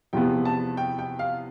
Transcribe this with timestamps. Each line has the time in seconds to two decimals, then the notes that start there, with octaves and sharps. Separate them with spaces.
0.13 E2 C3 F3 B3 G5
0.45 A5
0.77 G5
0.99 G5
1.19 F5